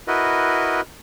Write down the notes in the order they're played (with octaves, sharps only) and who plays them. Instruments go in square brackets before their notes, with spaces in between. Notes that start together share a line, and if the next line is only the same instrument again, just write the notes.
[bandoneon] E4 F#4 A#4 B4 D#5